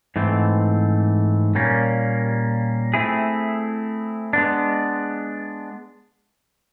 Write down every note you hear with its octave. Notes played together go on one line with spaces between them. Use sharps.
G#2 E3 A3 C4
A#2 G3 A#3 C#4
A3 C4 E4 G#4
G#3 B3 D4